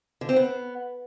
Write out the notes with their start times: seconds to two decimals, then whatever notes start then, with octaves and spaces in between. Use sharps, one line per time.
0.21 D3
0.29 C4
0.36 B3